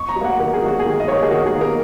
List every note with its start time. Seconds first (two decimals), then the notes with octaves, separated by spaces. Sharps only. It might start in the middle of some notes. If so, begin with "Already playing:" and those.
Already playing: C#6
0.09 A#5
0.16 F#3
0.21 A#3 F#5
0.39 D#3 A#4
0.53 G#4
0.62 F#3 A#3 F#4
0.79 G#4
0.86 D#3
1.00 D#5
1.07 F#3 C#5
1.11 A#3 A#4
1.23 G#4
1.30 D#3 F#4
1.46 G#4
1.53 F#3 A#3
1.61 A#4